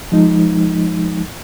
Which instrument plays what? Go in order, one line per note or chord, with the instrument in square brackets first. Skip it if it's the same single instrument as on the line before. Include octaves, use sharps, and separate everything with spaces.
[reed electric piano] F3 G#3 D#4